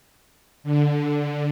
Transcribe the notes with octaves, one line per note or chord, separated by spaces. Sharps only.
D3